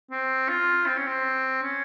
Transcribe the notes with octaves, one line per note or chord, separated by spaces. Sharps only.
C4
F4
C4
C#4
C4
C#4